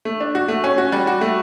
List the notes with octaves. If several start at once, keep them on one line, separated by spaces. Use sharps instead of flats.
A3
D4
F#4
A3
C#4
F#4
G3
F#4
A3